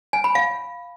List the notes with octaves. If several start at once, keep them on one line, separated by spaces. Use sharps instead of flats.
G#5
B5
F5